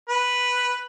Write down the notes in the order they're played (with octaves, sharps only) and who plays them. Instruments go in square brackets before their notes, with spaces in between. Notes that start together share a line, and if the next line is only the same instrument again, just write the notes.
[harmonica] B4